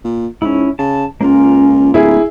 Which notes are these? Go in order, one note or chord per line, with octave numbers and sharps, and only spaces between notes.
A#2
G#2 C#4 E4
C#3 A5
C#2 A#3 C#4 F4
D1 E4 G#4